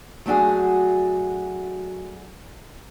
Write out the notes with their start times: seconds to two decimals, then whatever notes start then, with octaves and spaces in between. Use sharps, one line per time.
0.26 F#3 A3 D4 F#4 G#4